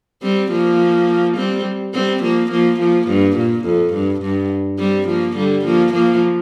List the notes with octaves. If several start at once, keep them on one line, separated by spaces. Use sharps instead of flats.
G3 C4
F3 A#3
G3 C4
G3 C4
F3 A#3
F3 A#3
F3 A#3
G2
A#2
F2
G2
G2
G3 C4
F3 A#3
D3 G3
F3 A#3
F3 A#3